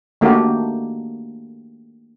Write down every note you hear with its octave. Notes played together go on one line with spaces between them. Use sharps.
D#3 A3 A#3 D4 F#4 G4